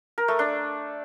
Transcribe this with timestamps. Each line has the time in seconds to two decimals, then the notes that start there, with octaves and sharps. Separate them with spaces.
0.18 A#4
0.28 A3
0.39 D4